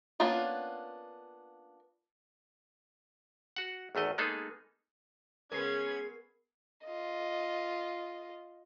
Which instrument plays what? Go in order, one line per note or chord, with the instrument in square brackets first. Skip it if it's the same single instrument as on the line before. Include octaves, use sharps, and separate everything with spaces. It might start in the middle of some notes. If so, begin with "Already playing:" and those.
[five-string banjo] A#3 B3 C#4 D4 F4
[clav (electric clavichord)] F#4 F#5
G#1 E2 A3 D#5
G#3 A#3 B3 D#4 G#4 A4
[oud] C#3 G#3 B4 [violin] B3 G#6 [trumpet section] C#4 [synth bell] A#4 C7
[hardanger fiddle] F4 D#5